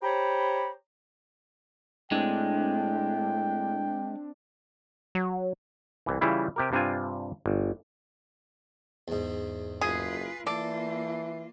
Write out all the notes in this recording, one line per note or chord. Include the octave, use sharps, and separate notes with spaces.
G4 C5 C#5 A#5 B5
A2 G#3 C4 D4 G5
F#3
C2 E3
C#3 E3 G3 E4 F4
C3 G4 A#4
G2 C3 C4 D4 F4 G#5
G1
E2 G#2
F#1 F4 G#4 B4
E3 A#3 F4 A4 D5